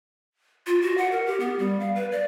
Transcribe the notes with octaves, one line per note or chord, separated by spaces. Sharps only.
F4
F#4
F#5
A#4
G4
B3
G3
F5
B4
D5